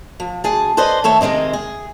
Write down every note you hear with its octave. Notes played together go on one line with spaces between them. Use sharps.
F3
D2 G#4 A5
A4 B4 C5 D5 D#5
D#3 A3 A4 C#5
C3 D#3 G#3 C4 D#4
G#4